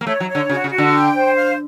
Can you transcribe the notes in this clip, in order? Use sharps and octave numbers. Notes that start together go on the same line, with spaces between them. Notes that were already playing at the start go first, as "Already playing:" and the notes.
A#3
A3 C#5
F#3
C#5
D3
C#3 F#4
C#3
F#4
D3
G5
C5
F5